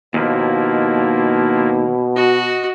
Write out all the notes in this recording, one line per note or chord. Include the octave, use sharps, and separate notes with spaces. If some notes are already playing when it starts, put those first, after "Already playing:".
D#2 B2 F3 A#3 E4
F#4 D#5